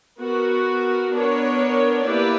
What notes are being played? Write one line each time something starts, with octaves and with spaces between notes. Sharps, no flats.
B3 F#4 A#4
B3 D4 A#4 C#5
A#3 E4 G4 B4 D5